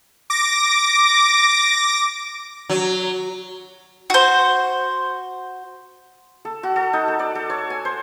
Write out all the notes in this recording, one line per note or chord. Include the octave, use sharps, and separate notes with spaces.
D6 A#6
F#3
F#4 C5
A4
F#4
A4
D#4
A4
D5
A4
C#5
G#5
C5